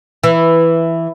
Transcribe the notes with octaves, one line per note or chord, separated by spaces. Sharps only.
E3